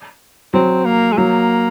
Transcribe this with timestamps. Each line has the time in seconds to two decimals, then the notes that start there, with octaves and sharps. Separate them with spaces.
0.54 F#3 C4
0.85 A#3
1.12 G#3
1.17 F#3 A#3